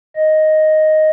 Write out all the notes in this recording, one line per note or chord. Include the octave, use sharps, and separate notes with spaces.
D#5